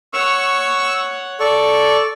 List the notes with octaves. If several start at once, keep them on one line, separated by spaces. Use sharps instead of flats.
C#5 F#5 C#6 E6
A4 D5 C#6